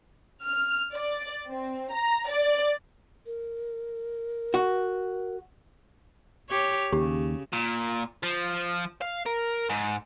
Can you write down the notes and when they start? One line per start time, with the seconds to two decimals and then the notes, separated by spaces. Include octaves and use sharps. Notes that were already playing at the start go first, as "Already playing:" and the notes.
0.43 F6
0.94 D5
1.47 C4
1.92 A#5
2.29 D5
3.26 A#4
4.54 F#4
6.49 G4 C#5
6.92 D#2 C#3 G4
7.53 A#2
8.23 F3
9.01 F5
9.26 A#4
9.69 G#2